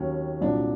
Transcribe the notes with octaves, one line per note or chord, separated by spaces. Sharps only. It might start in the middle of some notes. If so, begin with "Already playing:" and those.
Already playing: D#2 D#3 F#3 C#4
C2 A#2 F#3 D4